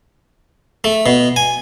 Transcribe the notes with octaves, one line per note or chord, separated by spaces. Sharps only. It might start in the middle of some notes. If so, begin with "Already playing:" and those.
A3
B2
G#5